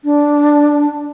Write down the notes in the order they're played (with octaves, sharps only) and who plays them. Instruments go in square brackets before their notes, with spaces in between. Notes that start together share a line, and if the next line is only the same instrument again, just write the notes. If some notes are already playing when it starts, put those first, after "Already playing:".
[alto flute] D4